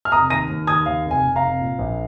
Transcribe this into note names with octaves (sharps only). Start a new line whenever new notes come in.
F6
F1 A#5 D#6
D#2 A#6 D#7
D#2
D#2 D#6 G#6
D#2 F5
F1
G#5
F1
F5 A#5
F1
A#2
A#1